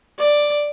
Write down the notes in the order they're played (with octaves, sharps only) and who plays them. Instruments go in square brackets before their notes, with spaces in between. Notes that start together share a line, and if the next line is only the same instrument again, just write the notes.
[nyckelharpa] D5